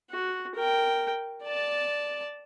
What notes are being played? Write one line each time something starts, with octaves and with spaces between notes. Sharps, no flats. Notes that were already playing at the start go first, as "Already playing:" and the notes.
F#4
A#4 G5
D5 A5